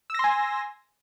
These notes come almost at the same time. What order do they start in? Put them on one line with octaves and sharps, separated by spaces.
E6 A#6 C6 G#5